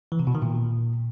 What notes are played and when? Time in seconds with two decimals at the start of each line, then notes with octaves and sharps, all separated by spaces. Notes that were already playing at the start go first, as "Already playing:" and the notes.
0.12 E3
0.19 C3
0.27 B2
0.35 D#3
0.42 A#2